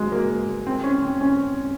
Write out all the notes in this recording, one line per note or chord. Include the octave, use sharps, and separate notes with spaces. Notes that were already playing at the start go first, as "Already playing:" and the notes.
Already playing: F#3 G#3
A#3
C4
C#4
C4
C#4